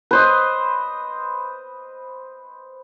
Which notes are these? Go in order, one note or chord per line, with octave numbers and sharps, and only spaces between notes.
B4 C5 D#5